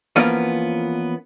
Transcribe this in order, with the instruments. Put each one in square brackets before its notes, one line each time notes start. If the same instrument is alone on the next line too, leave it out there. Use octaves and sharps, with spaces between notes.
[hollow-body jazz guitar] E3 F3 A#3 B3 C#4 F4